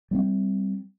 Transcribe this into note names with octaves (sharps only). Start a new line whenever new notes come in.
G3 B3 C4